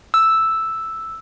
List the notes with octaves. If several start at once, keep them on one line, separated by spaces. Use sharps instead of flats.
E6